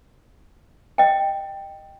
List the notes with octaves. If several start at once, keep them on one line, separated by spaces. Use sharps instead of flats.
D#5 G5